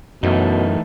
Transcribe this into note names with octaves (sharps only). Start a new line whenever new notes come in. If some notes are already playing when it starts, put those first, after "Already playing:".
F#2 B2 E3 A3 D#4